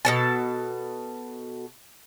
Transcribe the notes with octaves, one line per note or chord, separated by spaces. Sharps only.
B2 A4 A5